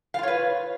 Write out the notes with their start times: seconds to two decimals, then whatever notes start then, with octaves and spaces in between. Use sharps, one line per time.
0.14 F5
0.19 F4
0.23 C#5
0.28 B4